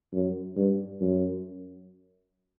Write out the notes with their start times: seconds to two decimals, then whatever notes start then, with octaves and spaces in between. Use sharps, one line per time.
0.13 F#2
0.56 G2
1.01 F#2